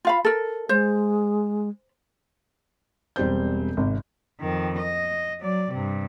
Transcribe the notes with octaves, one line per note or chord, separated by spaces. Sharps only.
F4 F5 B5
A4 A#4
G#3 C5
E1 G3 C4 C5 G6
G#1 C3
F2 D#3
D#5
F#3 D5
G2 C3